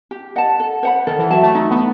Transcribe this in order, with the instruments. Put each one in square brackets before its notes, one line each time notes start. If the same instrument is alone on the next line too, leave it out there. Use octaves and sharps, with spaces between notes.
[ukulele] G4
D#5 F#5 A5
A4
C5 F#5 B5
[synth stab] D#3 [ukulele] A4
[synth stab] E3
[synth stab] F#3 [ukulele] E5 A5
[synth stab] A3
[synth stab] A3 [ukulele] D#4
[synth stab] B3